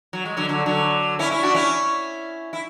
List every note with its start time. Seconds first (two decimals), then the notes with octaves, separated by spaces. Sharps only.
0.13 F#3
0.25 G#3
0.37 D3 F#3
0.49 D3 F#3
0.66 D3 F#3
1.19 C#4 E4
1.31 C#4 E4
1.43 D4 F#4
1.55 C#4 E4
2.53 E4